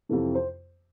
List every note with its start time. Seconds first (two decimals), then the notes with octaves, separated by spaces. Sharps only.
0.09 F2 C3 E3 A4
0.35 C5